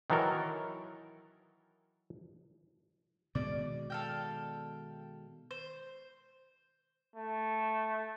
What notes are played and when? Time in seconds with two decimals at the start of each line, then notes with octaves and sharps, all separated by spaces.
0.10 D#3 E3 F#3 A4 A#4
3.35 B2 D#3 G#3 D5
3.90 A4 F5 G5
5.51 C5
7.16 A3